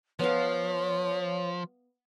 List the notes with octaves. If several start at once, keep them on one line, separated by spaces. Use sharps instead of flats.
F3 B3 C#5 F5